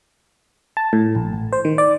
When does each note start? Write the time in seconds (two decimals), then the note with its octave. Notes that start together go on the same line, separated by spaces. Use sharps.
0.77 A5
0.93 A2
1.15 A#1
1.33 A1
1.53 C5
1.65 D#3
1.78 D5